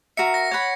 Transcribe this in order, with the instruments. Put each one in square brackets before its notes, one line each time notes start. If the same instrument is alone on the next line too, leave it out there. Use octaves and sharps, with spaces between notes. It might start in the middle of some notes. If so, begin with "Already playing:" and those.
[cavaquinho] F#4 A#4 E5 A#5 [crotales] C#7
[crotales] A#6
[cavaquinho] C#5 F#5 B5 [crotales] G#6